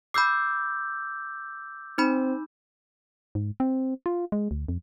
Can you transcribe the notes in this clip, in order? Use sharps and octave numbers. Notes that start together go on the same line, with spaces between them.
B5 D6 E6 G6 C7
C4 D#4 B5
G#2
C4
F4
G#3
D2
F2